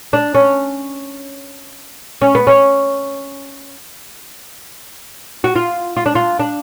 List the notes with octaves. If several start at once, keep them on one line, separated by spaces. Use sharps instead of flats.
D4
C#4
C#4
B3
C#4
F#4
F4
F4
D4
F4
D4